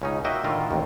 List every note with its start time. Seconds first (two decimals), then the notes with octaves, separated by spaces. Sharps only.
0.02 C#2 C#4 D#4
0.24 A#3 F#4 D#5 E5 G5
0.44 A2 D3 D#3 F4 A#4
0.71 A1 D#2